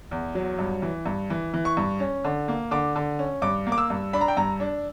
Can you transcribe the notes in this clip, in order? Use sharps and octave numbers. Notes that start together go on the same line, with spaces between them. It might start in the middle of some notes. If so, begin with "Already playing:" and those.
E2
F#3
G2
E3
G2
E3
E3
C#6
G2
C#4
D3
A#3
D3 D6
D3
C#4
G2 D6
A#3
D6
E6
G2
D4 B5
A#5
G5
G2 A#5
D4